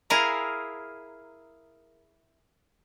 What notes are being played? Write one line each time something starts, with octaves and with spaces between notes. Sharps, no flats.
E4 G#4 A#4 F5 A#5